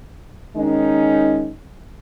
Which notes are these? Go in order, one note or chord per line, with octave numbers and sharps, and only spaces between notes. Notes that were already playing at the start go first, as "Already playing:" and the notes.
D#3 G#3 C#4 D#4